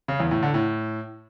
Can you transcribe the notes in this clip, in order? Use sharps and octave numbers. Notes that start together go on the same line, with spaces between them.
C#3
E2
A2
D3
A2